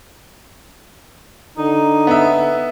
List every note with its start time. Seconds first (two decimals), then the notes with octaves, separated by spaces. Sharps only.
1.58 D3 D#4
2.07 B3 E5